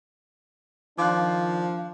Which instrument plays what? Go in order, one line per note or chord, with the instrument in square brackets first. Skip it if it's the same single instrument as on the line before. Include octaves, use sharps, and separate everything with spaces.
[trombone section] D#3 D4 [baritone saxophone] F3 [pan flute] F5 [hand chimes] D6 F#6